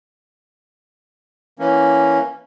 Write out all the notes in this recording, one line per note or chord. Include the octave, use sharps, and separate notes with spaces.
E3 A#3 C#4